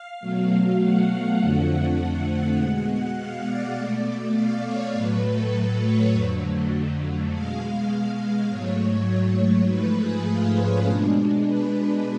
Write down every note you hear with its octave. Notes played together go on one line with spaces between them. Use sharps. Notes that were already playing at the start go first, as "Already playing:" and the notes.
Already playing: F5
B2 F#3 A3
F#5
F2 D3 F3 A3
B2 G#3
F5
D5
B2 A3
F5
C#5
A2 F#3 A3 B4
A4
B4
C#5
F2 D3 F#3 A3
B2 G#3 F5
G#2 F#3 A3 C#5
G#2 F3 A3 B4
G#4
F4
C#4
B2 G#3 D4
B4